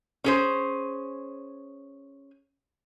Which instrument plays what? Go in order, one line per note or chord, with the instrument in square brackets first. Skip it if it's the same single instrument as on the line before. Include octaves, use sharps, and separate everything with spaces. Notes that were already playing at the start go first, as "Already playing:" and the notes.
[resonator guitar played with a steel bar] C#4 G#4 C5